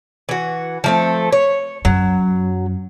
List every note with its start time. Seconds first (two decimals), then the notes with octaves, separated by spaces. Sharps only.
0.29 E3 F#4
0.84 F3 A3 C4
1.33 C#5
1.85 F#2 F#3